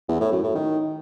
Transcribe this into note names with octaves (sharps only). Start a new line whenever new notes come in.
E2
A2
F#2
A2
D#3